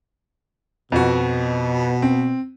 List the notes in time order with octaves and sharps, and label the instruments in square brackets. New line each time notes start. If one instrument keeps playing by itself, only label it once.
[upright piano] F2 F#4 [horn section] B2
[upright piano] C4